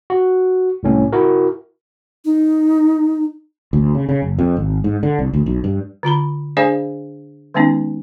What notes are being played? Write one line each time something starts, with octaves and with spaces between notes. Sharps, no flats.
F#4
C2 A2 C#4
E4 F#4 A#4
D#4
D2
C#3
C#3
F#1
F2
G#1
G#2
D3
C2
D2
B1
G2
D3 F4 A#5 B5
D4 G#4 C5 D5 F5 G#5
D#3 G#3 B3 C#4 D#4